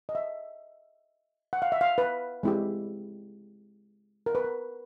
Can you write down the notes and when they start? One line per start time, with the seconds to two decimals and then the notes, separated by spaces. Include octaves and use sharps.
0.09 D#5
0.15 E5
1.53 F#5
1.62 F5
1.72 E5
1.81 F5
1.98 B4
2.43 G#3 C4 E4 G4
4.26 A#4
4.35 B4
4.44 A#4